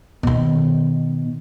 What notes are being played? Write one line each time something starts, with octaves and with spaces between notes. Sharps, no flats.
B2 D#3